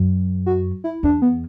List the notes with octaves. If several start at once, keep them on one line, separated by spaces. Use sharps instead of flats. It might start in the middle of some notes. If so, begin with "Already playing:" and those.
Already playing: F#2
F#4
E4
E2 D4
B3